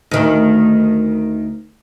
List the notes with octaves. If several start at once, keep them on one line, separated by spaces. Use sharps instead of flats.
D2 D#3